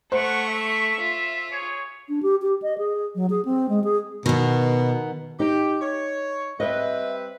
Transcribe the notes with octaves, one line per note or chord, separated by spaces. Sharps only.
A3 B3 C5 F#5 C#6
E5
F4
G#4 C#5
D4
G4
G4
D#5
G#4
F#3
G#4
C4
G#3
G#4
B2 D#3 B3
D#4 G4
C#5
G3 C4 B4 D#5 E5